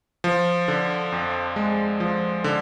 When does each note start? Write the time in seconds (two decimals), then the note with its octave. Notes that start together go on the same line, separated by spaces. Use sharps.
0.24 F3
0.68 D3
1.12 F2
1.56 G#3
2.00 F3
2.44 D3